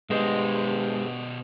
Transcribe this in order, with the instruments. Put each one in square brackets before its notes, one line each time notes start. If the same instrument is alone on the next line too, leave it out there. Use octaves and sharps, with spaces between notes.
[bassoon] G2 [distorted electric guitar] B2 C5 [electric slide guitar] G#3